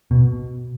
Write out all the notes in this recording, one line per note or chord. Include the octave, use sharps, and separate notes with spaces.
B2